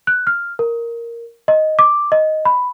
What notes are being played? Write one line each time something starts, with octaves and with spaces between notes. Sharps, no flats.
F#6
F6
A#4
D#5
D6
D#5
B5